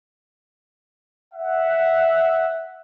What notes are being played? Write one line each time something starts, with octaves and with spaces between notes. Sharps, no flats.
E5 F#5